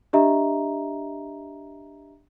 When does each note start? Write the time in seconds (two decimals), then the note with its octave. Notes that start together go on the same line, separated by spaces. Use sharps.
0.13 D4 G4 D#5 E5 A#5